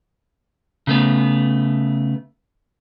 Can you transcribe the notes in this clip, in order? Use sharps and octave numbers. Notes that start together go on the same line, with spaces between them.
C#3 A3 B3